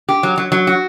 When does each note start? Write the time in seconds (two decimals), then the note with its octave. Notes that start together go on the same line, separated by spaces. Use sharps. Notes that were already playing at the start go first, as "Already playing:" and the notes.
0.09 G4
0.23 F#3
0.38 F#3
0.52 F#3
0.67 F#4